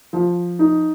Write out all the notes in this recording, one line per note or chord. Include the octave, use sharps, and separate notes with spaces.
F3
D#4